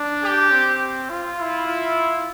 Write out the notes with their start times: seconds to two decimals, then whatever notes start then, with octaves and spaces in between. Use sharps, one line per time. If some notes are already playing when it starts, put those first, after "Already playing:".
Already playing: D4
0.22 G4
0.51 C4
1.09 F4
1.38 E4
1.67 F4